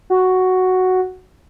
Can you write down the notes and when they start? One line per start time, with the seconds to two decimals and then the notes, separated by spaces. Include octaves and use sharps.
0.10 F#4